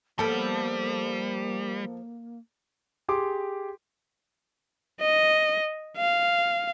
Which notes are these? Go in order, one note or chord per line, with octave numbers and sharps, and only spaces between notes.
F3 G3 A#3 B3 A4
G4 G#4 C6 D6
D#5
F5